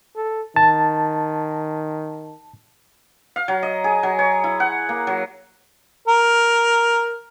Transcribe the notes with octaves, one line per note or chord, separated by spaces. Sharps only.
A4
D#3 A5
F5
F#3
D#5
G#4
F#3
C#5
E4
F#5
A#3
F#3
A#4